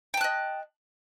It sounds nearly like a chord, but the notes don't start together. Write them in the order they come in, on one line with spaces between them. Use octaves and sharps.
G5 A5 F#6 D#5